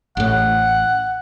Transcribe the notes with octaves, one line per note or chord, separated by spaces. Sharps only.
A1 A2 F#5